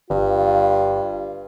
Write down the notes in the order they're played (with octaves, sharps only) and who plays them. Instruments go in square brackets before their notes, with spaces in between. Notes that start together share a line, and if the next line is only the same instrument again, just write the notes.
[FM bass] G1 [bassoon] G2 [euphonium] F4